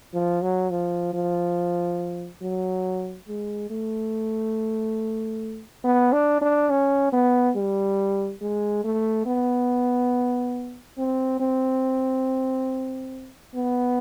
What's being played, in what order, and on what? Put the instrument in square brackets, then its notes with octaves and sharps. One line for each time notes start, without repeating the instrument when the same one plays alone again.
[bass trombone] F3
F#3
F3
F3
F#3
G#3
A3
B3
D4
D4
C#4
B3
G3
G#3
A3
B3
C4
C4
B3